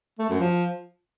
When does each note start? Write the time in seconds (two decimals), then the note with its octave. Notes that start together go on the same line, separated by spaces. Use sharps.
0.19 A3
0.29 F#2
0.40 F3